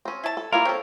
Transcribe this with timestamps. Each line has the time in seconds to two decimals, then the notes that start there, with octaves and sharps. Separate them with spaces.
0.05 C4 C#4
0.24 E4 A5
0.37 A4
0.53 G3 A#3 E4 F4 A#4 F5
0.65 C4 C#4 A4